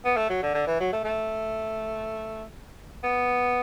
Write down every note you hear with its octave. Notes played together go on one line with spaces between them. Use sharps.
B3
A3
F#3
D3
D3
E3
F#3
A3
A3
B3